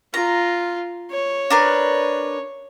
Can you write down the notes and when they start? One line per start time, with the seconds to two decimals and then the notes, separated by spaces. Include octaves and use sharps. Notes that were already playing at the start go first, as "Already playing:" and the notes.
0.14 F4 A#5
1.12 C#5
1.50 D4 A#4 B4